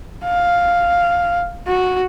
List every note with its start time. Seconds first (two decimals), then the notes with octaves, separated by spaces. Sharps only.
0.25 F5
1.68 F#4